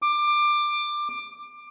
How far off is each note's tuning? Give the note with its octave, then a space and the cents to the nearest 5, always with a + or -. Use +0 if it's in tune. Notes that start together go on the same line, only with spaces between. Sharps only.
D6 +20